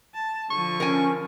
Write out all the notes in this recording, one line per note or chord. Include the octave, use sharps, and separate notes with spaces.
A5
D3 F3 C#6
C#4 A#4 G#5